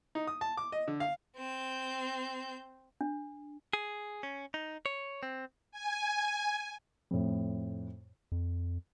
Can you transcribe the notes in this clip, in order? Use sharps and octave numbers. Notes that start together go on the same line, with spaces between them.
D#4
D#6
A5
D6
D#5
D3
F5
C4 G6
D4
G#4
C#4
D#4
C#5
C4
G#5
F2 A2
F2